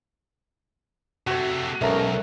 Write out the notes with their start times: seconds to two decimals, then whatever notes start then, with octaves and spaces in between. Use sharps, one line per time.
1.27 C3 A3 F#4 C#5
1.81 B1 G#2 A3 C#4 A#4